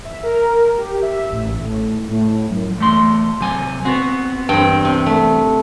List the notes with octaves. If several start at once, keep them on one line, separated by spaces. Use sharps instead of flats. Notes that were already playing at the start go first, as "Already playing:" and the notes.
E5
A#4
G4
E5
A1
A2
A2
F#2
E2 A3 C6
C3 F#3 G#5
B3 C4 F#4
E2 G2 C4 G5
C3
A3